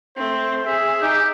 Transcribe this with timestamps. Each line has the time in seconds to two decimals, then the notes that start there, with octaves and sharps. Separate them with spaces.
0.17 A3 C4 C5
0.66 G#4 E5
1.02 D#4 G4